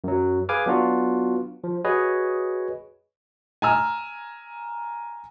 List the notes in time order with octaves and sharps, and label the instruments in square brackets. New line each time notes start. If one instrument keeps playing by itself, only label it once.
[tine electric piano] F#2 F#3
G#4 B4 F5 G#5 D6 F6
F#3 B3 D4 F4 F#4
F3
F#4 G#4 B4 C#5 D#5
[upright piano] G#5 A#5 E6 F6